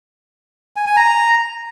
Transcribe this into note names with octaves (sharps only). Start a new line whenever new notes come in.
G#5
G#5
A#5